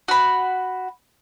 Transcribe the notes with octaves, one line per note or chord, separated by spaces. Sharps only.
F#4 B5